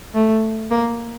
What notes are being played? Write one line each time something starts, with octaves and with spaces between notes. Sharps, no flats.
A3
A#3